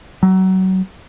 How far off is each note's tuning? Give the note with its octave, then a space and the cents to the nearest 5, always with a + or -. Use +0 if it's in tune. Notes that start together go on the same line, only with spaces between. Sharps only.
F#3 +25